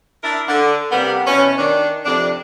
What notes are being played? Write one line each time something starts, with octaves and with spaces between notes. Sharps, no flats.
D4 E4 A#4 E5
D3
C3 G3 A#3 B3
B2 E3 C#4
D#3 D4
F2 C3 D4